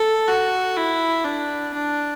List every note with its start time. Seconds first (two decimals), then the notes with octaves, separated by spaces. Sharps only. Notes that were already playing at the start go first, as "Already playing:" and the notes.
Already playing: A4
0.28 F#4
0.77 E4
1.25 D4
1.74 D4